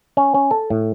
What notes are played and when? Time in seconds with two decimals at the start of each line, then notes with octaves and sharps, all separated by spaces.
0.17 C#4
0.34 C#4
0.51 A4
0.70 A2